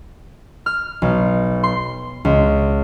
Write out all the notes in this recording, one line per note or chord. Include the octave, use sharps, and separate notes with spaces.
F6
B1
C6
C#2